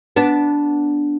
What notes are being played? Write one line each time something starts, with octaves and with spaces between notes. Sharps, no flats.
B3 D4